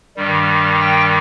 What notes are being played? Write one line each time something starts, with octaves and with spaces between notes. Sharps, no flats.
G2 D#3 G3
G5